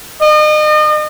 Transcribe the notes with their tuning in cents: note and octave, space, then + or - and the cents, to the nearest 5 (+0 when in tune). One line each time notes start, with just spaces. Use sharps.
D#5 -35